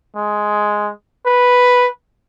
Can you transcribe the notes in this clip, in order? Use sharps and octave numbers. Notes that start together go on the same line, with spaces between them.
G#3
B4